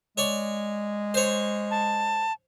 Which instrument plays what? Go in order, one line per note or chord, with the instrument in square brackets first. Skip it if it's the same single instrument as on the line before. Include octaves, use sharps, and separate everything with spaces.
[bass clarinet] G#3 [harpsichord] C#5 D5
[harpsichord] C5 C#5
[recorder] A5